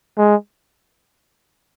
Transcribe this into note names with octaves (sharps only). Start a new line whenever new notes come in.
G#3